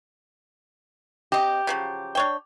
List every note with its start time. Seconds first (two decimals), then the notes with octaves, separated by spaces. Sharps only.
1.32 C4 G4 D#5
1.67 C#3 F3 F#3
2.15 D4 C#5 G5